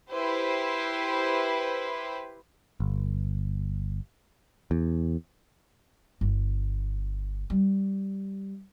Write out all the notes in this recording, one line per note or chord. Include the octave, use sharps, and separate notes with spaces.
E4 G4 B4 C5
G1
E2
G1
G3